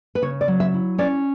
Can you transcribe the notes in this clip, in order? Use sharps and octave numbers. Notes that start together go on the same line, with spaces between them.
B4
C#3 C#5
D5
F#3
E5
E4
C#4 D5